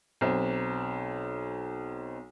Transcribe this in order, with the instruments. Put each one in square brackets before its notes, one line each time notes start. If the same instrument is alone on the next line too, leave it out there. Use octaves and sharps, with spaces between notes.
[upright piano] B1 C4